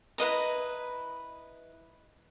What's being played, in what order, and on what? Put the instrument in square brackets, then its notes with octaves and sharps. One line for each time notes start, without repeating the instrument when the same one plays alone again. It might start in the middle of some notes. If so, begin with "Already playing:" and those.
[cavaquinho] E4 B4 D#5 A#5